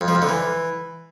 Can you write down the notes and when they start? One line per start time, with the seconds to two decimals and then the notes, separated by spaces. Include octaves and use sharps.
0.01 F2
0.08 F3
0.15 F2
0.22 D3
0.29 E3